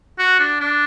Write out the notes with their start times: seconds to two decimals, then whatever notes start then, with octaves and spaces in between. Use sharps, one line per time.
0.19 F#4
0.39 D4
0.60 D4